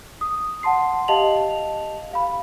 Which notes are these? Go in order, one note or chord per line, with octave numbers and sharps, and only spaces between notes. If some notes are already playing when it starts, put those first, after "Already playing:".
D#6
F#5 A5 C6 C7
G4 D#5 F5 A5 F7 F#7
F5 B5